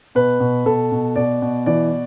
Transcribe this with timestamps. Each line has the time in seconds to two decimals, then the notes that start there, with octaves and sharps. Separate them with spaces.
0.15 B2 B4
0.40 B2
0.65 B2 A4
0.92 B2
1.16 B2 D5
1.42 B2
1.66 E3 D5